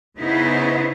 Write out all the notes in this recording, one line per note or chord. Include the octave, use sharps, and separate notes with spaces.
C#3 B3 D#4 E4 G#4 C5